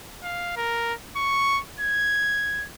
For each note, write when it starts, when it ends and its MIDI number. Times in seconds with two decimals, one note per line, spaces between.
0.23 0.52 77
0.57 0.93 70
1.17 1.60 85
1.80 2.66 92